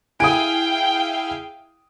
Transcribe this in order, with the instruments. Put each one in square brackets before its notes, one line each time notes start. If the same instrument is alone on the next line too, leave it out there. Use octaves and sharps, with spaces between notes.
[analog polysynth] E4 G#4 F5 [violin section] G5 [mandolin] G#5 [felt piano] D#6 D7